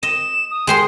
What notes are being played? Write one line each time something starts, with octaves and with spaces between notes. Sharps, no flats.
D#5 E7
D#6
G#3 C5 C6